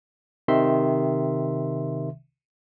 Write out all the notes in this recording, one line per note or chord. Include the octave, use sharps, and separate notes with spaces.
C3 D#3 E5 C6